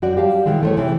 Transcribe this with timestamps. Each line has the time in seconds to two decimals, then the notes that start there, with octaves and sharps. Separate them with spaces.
0.02 F#2 F#4 D5
0.16 G3 G4 F5 A5
0.46 B2 D#3 E3 G#3
0.63 A3 C5 C#5
0.77 C3 E3